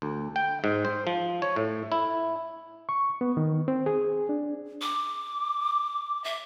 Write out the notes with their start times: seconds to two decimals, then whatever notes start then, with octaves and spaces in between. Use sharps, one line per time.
0.02 D2
0.36 G5
0.64 G#2
0.85 C5
1.07 F3
1.42 C#5
1.56 A2
1.92 E4
2.89 C#6
3.21 B3
3.37 D#3
3.68 C4
3.86 G#4
4.29 D4
4.81 D6
6.24 E5